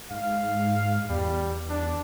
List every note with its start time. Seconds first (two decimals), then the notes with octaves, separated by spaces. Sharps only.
0.11 G#2 F5
1.09 E2 G3
1.69 D4